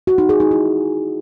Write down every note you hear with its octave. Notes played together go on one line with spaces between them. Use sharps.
F#4
D#4
G#4
D#4
E4